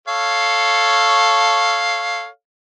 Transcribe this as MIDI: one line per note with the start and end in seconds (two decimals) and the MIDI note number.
0.08 2.27 69
0.08 2.27 73
0.08 2.27 77